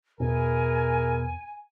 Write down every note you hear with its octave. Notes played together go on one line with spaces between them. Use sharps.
E2 B2 E4 G#4 A#4 G#5